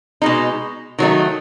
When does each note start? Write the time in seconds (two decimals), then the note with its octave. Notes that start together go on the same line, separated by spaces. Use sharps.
0.22 B2 G#3 D#4
0.99 D#3 F#3 A3 D#4